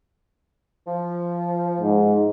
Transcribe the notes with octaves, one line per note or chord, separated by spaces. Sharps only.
F3
G#2